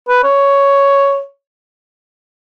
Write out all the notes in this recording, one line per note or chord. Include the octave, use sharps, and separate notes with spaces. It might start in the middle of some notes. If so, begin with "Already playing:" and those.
B4
C#5